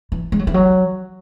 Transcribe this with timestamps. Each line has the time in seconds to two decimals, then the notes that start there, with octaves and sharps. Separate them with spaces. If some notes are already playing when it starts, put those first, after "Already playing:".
0.12 E3
0.32 G#3
0.39 F#3
0.47 E3
0.54 F#3